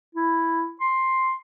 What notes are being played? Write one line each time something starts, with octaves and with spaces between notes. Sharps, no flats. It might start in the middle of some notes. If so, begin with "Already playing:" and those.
E4
C6